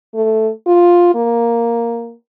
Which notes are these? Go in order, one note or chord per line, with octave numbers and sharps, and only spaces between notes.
A3
F4
A#3